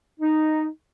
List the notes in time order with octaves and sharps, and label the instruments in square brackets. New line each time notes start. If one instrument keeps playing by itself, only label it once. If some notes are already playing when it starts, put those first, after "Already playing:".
[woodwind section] D#4